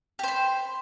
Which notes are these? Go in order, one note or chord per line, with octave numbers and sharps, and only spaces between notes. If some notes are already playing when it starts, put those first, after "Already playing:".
G4 C5 B5